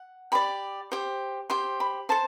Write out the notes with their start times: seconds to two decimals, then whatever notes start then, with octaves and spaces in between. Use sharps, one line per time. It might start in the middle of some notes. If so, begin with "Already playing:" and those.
Already playing: F#5
0.32 G4 D5 B5
0.92 G4 C5
1.50 G4 C5 C6
1.80 B5
2.09 A4 C5 A5